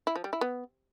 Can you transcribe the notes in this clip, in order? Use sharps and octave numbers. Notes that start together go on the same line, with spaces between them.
E4
F3
G3
E4
B3